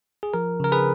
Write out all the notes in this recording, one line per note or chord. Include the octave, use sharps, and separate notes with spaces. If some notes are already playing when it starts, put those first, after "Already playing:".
G#4
F3 A#4
C#3 A#4
G#4 B4